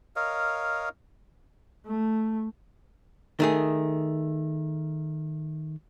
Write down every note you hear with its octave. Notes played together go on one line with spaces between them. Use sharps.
A#4 C#5 D#5 F5
A3
D#3 A3 G#4